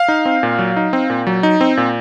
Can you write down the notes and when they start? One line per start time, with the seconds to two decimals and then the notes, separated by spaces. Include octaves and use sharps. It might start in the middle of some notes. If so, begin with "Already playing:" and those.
Already playing: F5
0.08 D#4
0.26 C4
0.43 A#2
0.59 F#3
0.77 D#4
0.93 C4
1.10 A#2
1.27 F#3
1.43 D#4
1.61 C4
1.77 A#2